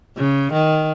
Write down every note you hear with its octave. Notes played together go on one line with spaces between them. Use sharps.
C#3
D#3